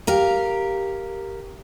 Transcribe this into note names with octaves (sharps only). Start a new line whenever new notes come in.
G4 A#4 F5